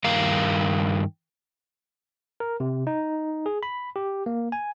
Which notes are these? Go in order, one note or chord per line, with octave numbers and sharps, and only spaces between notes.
G2 D#3 A#4 F5 A#5
A#4
C3
D#4
G#4
B5
G4
A#3
G#5